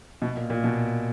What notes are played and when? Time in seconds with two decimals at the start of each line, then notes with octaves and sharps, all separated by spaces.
0.22 B2
0.37 A#2
0.50 A#2
0.64 B2